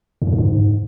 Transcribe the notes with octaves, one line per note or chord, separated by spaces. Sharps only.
F#2
G2
F#2
G#2